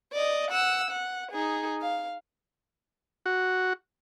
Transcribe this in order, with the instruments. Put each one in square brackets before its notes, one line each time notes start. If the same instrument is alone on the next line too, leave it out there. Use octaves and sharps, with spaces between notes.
[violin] D5 D#5
F#5 E6
F#5
D#4 G#4
F5
[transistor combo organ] F#4